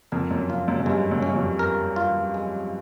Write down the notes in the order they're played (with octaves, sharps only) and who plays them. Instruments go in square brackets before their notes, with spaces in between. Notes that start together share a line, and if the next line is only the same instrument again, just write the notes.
[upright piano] F2 [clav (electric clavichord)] A#4
[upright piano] F#2
[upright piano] F2 [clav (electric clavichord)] F4
[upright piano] F#2
F#2
[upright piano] G2 [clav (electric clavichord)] G#3
[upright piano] F#2
[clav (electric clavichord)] C#4
[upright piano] F#2
F2
[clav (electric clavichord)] A#4
F4
G#3